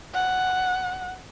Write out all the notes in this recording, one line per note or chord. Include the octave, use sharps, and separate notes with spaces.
F#5